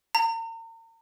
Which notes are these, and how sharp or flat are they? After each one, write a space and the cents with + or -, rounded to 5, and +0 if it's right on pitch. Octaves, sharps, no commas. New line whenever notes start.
A#5 -40